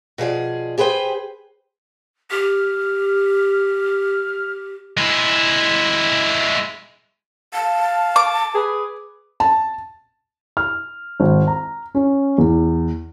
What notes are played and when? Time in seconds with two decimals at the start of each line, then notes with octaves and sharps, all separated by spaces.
0.18 B2 F3 G#4 D5
0.78 G4 G#4 B4 C5 G5
2.31 G4 F6
4.97 G#3 E4
7.54 F5 A5
8.16 D6
8.55 G#4 B4
9.40 A5
10.57 F6
11.20 G#1
11.47 A#5
11.95 C#4
12.38 E2